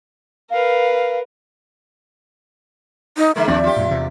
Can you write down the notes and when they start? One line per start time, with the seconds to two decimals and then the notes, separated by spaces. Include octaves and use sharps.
0.50 A#4 B4 F5
3.17 D#4
3.36 D3 G#3 A#3 E5
3.48 D#2 A2 F3 C4 D4 D5
3.64 F4 G4
3.76 F#2 A#2
3.91 E2 C3